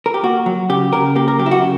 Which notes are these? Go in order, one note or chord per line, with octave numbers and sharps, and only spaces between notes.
A#4
G4
A#3 F#4
F#3
C#3 G4
C#3 A#4
A#3 G4
A#4
F#3 G4
E4
F#4
C#3